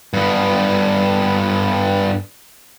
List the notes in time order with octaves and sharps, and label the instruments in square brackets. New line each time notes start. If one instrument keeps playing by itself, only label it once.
[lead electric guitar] G2 B3